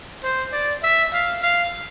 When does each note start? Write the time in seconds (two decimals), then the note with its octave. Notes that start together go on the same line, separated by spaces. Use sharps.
0.23 C5
0.52 D5
0.83 E5
1.13 F5
1.43 F5